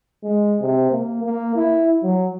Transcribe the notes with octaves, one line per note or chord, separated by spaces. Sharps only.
G#3
C3
A#3
A#3
E4
F#3